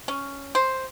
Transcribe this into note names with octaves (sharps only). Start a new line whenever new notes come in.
C#4
C5